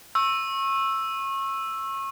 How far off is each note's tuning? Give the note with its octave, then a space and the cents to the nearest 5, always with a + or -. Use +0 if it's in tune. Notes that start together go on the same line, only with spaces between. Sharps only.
C#6 -30 E6 +0